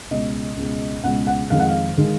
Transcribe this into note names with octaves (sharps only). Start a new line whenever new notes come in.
C#2 B2 G#3 D#5
C#2 B2 G#3
C#2 B2 G#3 F#5
F#5
F2 D#3 G#3 F5
F#5
F5
D#3 G#3